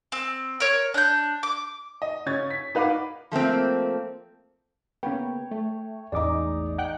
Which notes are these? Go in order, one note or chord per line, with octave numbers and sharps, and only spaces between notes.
C4
A#4 C#5
D4 G6
D6
D#5
C#3 C#4 G#6 A6
B6
D#4 B4 F5 F#5 D6
F3 A3 A#3 C4
C#3 A#3 B3 C#5 G5
A3
A1 E2 G#3 D#4 D5 D6
F#5 G5 F#6